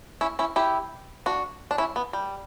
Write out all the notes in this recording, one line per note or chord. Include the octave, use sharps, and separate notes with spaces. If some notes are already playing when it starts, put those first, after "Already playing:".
C#4 E4
C#4 E4
E4 G4
D4 F#4
D4
C#4 E4
B3
G3